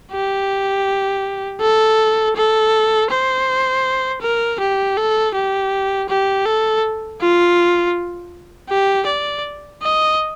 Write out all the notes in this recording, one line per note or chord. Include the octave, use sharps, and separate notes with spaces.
G4
A4
A4
C5
A#4
G4
A4
G4
G4
A4
F4
G4
D5
D#5